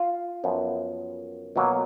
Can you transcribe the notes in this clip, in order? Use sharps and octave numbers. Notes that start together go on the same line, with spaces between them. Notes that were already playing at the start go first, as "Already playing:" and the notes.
Already playing: F4 F5
F#2 F3 B3
B2 F#3 A#3